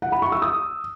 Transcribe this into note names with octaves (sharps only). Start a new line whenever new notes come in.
F#5
B5
C#6
E6
D#6